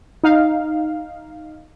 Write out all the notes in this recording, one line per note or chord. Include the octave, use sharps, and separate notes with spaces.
D#4 F5